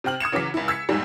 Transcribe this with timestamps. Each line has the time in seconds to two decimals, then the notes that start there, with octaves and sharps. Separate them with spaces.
0.04 C3 C4 G5 F6 F#7
0.20 D#6 G#6 C#7 E7
0.32 C#3 E3 F#3 D6 B6
0.54 C#2 E4
0.68 E6 G#6 B6 C#7
0.89 B1 E2 G#2 G3